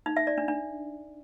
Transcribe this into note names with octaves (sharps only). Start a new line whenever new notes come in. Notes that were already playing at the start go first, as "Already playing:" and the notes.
D#4
E5
D5
D4
D4